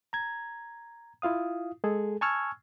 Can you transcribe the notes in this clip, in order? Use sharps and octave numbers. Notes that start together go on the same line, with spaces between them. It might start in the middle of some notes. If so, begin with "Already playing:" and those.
A#5 G#6
E4 F4 F5 D#6
G#3 G#4 A4
G#5 A5 C#6 E6 F6 G#6